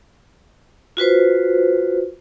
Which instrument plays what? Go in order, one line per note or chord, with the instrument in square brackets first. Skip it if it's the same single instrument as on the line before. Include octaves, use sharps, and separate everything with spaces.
[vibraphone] F4 F#4 B4 C5